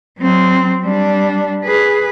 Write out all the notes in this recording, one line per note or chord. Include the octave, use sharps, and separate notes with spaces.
F#3 C4
G3 D4
G#4 B4